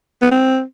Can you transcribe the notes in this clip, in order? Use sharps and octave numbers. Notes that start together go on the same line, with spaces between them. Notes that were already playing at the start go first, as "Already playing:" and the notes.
B3
C4